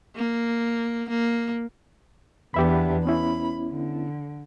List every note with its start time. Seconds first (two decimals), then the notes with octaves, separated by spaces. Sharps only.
0.16 A#3
1.09 A#3
2.54 E2 B3 D4 G4 E5 B5
3.05 B3 C#4 E4 B5
3.71 D3